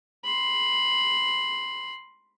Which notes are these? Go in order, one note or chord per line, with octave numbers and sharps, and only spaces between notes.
B5 C6